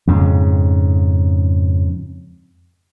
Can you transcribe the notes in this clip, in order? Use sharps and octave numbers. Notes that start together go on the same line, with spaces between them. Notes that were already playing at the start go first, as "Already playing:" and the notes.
F2 G#2 C#3